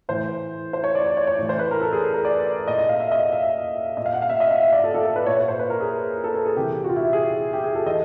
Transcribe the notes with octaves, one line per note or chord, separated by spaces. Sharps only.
A2 E3 C5
C5
C#5
D5
D5
C#5
C#5
A2 E3
C5
B4
A#4
A4
G#4
A#4
D5
A#2 D#5
D#5
F5
E5
D#5
E5
A#2 D#5
F5
F#5
F5
E5
D#5
E5
E5
D5
A4
A4
A4
B4
A#2 C#5
C#5
C5
B4
A#4
G#4
A4
A4
G#4
C3 E3 G4
F#4
F4
E4
G#4
G4
G#4
A4
E3 D#5